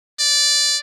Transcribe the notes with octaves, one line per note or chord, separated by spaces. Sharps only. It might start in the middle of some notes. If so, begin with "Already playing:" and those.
D5